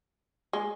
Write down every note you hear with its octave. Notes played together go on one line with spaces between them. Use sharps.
G#3